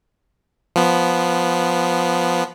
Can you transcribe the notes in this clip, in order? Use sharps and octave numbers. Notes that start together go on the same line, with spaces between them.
F3 B3